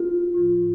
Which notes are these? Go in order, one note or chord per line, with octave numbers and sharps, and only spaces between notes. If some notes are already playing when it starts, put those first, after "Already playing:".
Already playing: F4
A2 F3